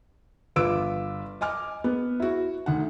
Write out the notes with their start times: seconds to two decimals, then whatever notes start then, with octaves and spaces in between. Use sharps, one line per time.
0.56 G1 F4 B4 D6 E6 D7
1.41 D#5 G#5 D6 F6
1.84 B3
2.20 E4 F#4
2.66 D2 D#3 F#5